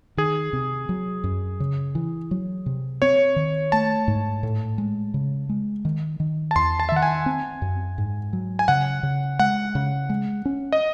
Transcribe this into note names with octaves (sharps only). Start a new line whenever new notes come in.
D#3 G#4
C3
F#3
F#2
C#3
E3
F#3
C3
C4 C#5
D#3
A3 A5
G#2
A2
G#3
C#3
G#3
D#3
D#3
A5
E2 C6
A5
E5
D#3 F#5
G#5
C4
F#2
G#2
F#3
G#5
C#3 F#5
C#3
G#3 F#5
C#3
G#3
C#4
D#5